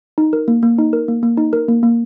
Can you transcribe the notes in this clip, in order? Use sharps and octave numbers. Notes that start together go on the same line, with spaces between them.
D#4
A#4
A#3
A#3
D#4
A#4
A#3
A#3
D#4
A#4
A#3
A#3